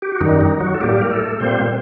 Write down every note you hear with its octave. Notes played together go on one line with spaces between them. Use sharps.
G4
F#4
F#2 D#3 G3 D#4
D#4
F#3 F#4
A4
A2 G3 A#3 G4
A#4
A3 A4
A#2 G3 A#3 C4 C5